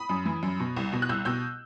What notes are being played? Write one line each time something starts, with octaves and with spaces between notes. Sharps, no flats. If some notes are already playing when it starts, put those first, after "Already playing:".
Already playing: B5 D#6
F#2
E3
F#2
B2
C2
B2
F#6
C2 E6 G6
B2 E6 G6